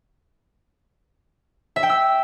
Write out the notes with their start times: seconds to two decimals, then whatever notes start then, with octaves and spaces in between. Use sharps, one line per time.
1.76 E5
1.83 G5
1.90 E6